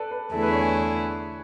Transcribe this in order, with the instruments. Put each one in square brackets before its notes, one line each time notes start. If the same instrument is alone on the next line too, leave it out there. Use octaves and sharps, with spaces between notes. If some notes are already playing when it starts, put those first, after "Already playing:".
Already playing: [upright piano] A4 B4 D5
B4
[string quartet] E2 D3 A3 E4 G#4 [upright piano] A4
[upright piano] B4
C#5
G#5